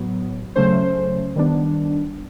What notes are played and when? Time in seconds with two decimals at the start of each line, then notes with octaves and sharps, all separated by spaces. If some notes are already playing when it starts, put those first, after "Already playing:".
Already playing: A2 F#3 B3
0.56 C#3 F#3 A3 C#4 C5
1.36 D#3 G3 B3 D4